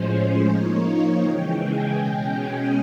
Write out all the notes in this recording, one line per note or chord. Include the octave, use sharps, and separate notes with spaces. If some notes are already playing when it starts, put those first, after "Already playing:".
Already playing: A2 F3 G#3 C#4 C5
F3 A#3 D#4 C#5
C#5
C#3 E3 G#3 G5
G#5
B2 G#3 C#4 G5
G#5